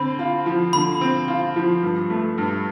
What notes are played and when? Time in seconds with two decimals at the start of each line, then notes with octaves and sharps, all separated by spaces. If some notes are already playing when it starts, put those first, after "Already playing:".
Already playing: D3 C4 B5
0.19 F4
0.46 F3
0.73 D3 B5
1.01 C4
1.28 F4
1.56 F3
1.83 G2
2.10 A3
2.38 G2